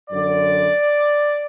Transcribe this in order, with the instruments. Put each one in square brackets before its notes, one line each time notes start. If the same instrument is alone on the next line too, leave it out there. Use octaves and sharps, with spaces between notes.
[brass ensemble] F#2 D3 D5